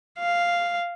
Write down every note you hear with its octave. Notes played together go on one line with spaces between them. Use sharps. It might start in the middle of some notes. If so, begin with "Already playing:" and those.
F5